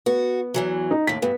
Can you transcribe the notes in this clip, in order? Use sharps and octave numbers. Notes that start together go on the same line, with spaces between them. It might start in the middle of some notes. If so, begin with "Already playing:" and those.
B3 F#4
E2 E3 F#3
D#4
D#2 A2 B6
G2 B3